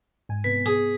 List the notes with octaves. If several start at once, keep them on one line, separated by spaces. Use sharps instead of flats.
G#2 G#5
C3 B3 B4 B6
G#4